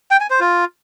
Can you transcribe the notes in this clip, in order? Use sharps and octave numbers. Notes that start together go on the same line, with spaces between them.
G5
G#5
C5
F4